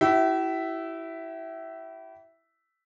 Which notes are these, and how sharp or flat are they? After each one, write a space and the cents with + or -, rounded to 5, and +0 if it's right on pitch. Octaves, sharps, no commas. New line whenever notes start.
E4 +0 G4 -45 E5 +0